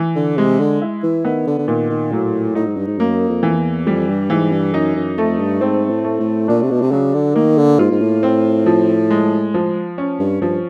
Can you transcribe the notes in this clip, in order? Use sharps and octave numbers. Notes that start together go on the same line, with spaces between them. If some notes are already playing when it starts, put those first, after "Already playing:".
Already playing: E3
D3
C3 G#3
D3
E4
E3
D#3 B3
D3
D3
A#2 D#3
D#3
A2 F#3
A2 D#4
G#2
G2
G#2
F#2 A#3
F2
E3
E2
F2 G3
G2
G#2 E3
G2
F#2 D#4
F#2
F2 A3
G2
G#2 C4
A2
A3
A2
A#2 D4
C3
B2
C3
C#3 F#3
D3
D#3 A#3
D3
G#2 F4
G#2
A2
C4
F3
G#3
F3
C#4
G2
G2 F3